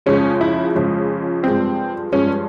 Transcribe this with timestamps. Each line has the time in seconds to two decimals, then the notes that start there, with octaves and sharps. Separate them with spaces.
0.06 F2 C#3 F3 G#3 C#4
0.41 E4
0.75 F2 C#3 F3 G#3
1.43 G2 F3 G#3 C4
2.12 G2 F3 G#3 C#4